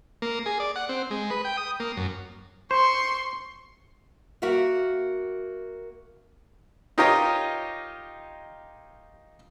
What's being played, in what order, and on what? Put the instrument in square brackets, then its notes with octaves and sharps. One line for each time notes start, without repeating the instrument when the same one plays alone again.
[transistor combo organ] A#3
G#4
D5
F#5
C4
G#3
B4
G5
D#6
A#3
F#2
[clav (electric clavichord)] C5 [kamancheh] C6 C#6
[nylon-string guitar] A#3 F#4 A#4 E5 F5
[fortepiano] D#4 F4 G4 A#4 C#5 D#5